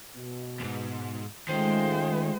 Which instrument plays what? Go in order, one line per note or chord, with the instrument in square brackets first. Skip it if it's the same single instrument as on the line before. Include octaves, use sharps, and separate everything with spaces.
[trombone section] B2
[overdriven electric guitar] D2 G#2
[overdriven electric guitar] D#3 [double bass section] G#3 [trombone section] A3 C#4 F4 [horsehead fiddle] C5 G5